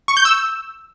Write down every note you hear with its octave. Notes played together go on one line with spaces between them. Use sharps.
C#6
G6
E6